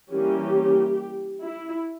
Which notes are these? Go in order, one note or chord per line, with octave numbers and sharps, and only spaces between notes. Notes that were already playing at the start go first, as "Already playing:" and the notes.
E3 G3 A#3 C#4 G4
E4